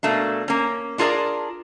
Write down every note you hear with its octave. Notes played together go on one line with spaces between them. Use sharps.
B2 A3 A#3 D4
A#3 C#4
D4 F4 G#4 A#4 D5